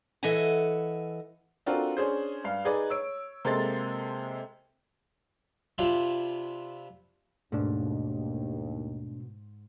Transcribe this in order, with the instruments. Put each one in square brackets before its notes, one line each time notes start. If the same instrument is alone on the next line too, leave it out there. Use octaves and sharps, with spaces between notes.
[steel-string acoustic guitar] E3 A4 D#5 E5 F#5 G#5
[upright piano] C4 D4 F4 F#4 A4 A#4
C#4 D4 G#4 C5
G2 F5
D#4 G#4 B4 D5
C#5 E6 D7
C3 G#3 A#3 A4 C6 A6
[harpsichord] C3 D4 E4 F4
[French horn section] D#2 [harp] G#2 [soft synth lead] B2 [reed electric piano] A3 D4